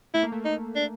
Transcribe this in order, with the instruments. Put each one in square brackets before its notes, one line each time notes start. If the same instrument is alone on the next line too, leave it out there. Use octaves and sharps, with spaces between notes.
[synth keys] A3 [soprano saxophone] E4
[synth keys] A#3
A3
[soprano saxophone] D#4
D4